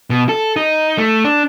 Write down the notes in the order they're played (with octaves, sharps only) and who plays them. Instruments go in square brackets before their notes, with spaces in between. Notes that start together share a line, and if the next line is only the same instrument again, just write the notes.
[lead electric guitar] B2
A4
D#4
A3
D4